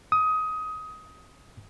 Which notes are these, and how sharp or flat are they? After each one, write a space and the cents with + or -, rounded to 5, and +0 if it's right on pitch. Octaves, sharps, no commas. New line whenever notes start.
D#6 +20